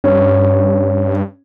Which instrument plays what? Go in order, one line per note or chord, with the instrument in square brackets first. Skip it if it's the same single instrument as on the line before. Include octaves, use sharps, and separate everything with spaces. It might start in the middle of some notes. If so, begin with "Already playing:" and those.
[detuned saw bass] G2 [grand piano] C#4